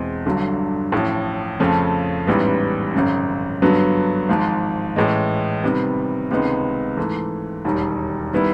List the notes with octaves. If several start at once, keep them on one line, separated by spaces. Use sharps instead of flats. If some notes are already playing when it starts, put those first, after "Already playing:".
Already playing: E2 B2 G#3 C4
G1 G2 D3 F#3
A1 A2 F3
F2 C#3 F3 A3 C#4
A1 G#2 E3 G3 B3
G#1 F#2 C#3
G2 D3 F#3 B3
G#1 G#2 F3
A1 A2 E3 G#3
C3 D#3 G3 B3
C#2 C3 D#3 G#3 B3
G#2 E3 A3
E1 D#2 D#3 G3
D#3 G3 B3 E4